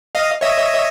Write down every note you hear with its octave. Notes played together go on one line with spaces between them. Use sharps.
D#5 F5
C#5 D#5 E5